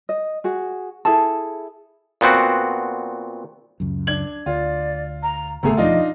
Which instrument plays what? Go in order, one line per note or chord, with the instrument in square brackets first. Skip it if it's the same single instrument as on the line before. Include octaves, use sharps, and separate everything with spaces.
[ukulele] D#5
F#4 G#4
E4 G#4 A4 A5
[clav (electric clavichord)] A#2 B3 C4 F#4
[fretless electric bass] C#2 F#2
[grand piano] D4 G#6 F#7
[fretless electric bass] D2 [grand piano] F4 [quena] D5
[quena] A#5
[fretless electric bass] G#1 C#3 B3 [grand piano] D2 A3 G#4 [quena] A#5
[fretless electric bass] E1 F2 F3 [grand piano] D4 D#4 F4 [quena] D#5